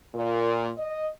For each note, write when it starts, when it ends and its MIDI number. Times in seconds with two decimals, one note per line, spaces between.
0.14 0.69 46
0.77 1.07 75